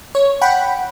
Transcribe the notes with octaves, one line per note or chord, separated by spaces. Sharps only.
C#5
F#5 G5 B5